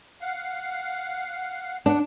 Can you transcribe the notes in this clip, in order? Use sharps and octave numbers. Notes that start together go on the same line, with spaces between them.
F5 F#5
D2 D4 F#5